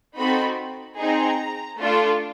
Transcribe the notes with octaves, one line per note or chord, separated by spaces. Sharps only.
C4 D#4 F#4 A4 B5
C4 D#4 G#4 A#5
A3 D4 F4 A4